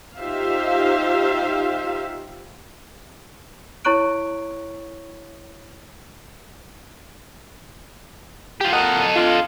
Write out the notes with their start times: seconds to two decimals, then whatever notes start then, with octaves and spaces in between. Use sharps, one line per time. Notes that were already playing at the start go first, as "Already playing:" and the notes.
0.17 D#4 F4 G4 C5 E5 F5
3.85 E4 C#5 A#5 C#6 F#6 D7
8.61 F4 G4
8.72 A#2 A4 A#4 D#5 F#5
9.15 D4 F4